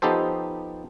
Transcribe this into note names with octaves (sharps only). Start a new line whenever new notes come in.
F3 B3 D#4 G4 A4 C5